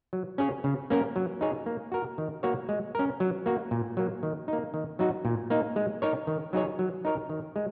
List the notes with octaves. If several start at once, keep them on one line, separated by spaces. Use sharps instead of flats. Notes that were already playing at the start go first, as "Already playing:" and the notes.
F#3
C#4 G#4 C#5
C#3
A#3 C#4 A#4
F#3
D#4 G#4 C#5
A#3
F#4 A#4
D#3
A#3 F#4 C#5
G#3
C#4 A#4
F#3
A#3 F#4
A#2
F#3 A#3
D#3
A#3 D#4
D#3
F#3 D#4 F#4
A#2
A#3 D#4
G#3
D#4 A#4 C#5
D#3
F#3 D#4 G#4 C#5
F#3
D#4 A#4 C#5
D#3
G#3